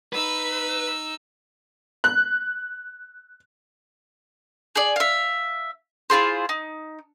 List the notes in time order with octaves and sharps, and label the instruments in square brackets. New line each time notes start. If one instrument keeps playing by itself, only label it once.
[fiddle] D#4 E6 [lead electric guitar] B4
[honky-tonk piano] F#6
[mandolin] G#4 D5
E5 F5
E4 F4 G#4 C5
D#4